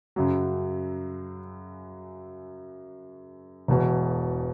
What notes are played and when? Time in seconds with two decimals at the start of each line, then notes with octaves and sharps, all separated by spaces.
0.16 F#2 C#3 F#3
3.68 E1 E2 B2